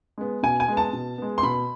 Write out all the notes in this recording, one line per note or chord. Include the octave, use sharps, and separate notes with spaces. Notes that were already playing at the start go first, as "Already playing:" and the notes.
G#3 B3
B2 G#5
G#5
G#3 B3
A5
B2
G#3 B3
C6
B2 B5